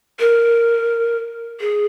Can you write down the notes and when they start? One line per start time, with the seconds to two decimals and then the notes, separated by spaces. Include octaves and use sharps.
0.20 A#4
1.61 G#4